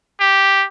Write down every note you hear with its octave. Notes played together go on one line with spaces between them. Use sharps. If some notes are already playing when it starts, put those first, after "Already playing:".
G4